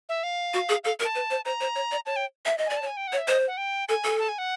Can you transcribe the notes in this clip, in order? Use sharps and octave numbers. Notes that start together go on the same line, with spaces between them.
E5
F5
F#4
G#4
A4 F5
A#4
A5
B4
C5
C5 A#5
C5
C#5
D5
C#5 A5
G5
E5
D#5
D5 G#5
A5
C#5
G#5
G5
F#5
C#5
E5
C5 D#5
F#5
G5
A4 G#5
A4
A5
G#5
F#5